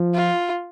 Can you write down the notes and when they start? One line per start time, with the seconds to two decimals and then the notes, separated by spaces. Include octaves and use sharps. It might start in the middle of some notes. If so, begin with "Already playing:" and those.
Already playing: F3
0.14 F4